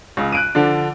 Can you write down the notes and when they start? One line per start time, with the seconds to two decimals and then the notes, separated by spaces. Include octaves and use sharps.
0.17 C#2 C#3
0.32 F#6 D7 D#7
0.55 D3 F3 D4